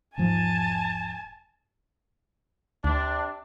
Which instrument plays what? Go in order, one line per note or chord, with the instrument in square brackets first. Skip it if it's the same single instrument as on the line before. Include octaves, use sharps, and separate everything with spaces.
[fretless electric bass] E1 G#2 F3 [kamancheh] G#5 A5
[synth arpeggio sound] D2 [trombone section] C3 D4